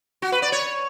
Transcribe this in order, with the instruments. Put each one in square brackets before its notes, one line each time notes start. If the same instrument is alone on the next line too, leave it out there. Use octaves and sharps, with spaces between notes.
[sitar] F#4
B4
D5
C#5